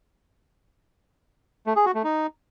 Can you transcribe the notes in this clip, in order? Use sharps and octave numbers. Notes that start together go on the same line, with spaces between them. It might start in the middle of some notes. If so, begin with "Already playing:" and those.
A3
G#4
F#4
A3
D#4